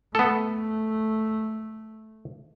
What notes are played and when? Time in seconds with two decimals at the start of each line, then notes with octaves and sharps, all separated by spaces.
0.15 A3 B3 A4